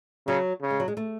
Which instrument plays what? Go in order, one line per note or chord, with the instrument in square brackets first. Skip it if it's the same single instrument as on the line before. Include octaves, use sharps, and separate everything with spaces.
[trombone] C#3 [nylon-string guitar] F#3
[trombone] C#3
[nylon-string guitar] G#3
F#3
G#3
A3